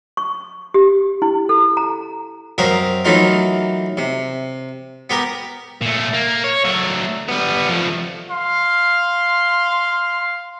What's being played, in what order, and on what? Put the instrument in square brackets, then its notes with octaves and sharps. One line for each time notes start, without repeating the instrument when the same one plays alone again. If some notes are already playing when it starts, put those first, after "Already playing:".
[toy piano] C#6
G4
E4
A4
A#5
[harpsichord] F#2 C4 F#4 A#4 F5 D#6
E3 F#3 A3 A#3 D#4 F4
C3
B3 G4 A#4
[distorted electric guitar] A#2 A3
A#3
C#5
F#3 A3
G3 B3
F3 A3
[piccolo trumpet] F5 [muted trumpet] C6